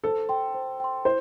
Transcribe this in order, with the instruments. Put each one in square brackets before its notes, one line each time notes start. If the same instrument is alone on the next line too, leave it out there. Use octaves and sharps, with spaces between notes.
[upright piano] A4 [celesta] C5
[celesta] G5 C6
C5
G5 C6
[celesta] E4 [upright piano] C5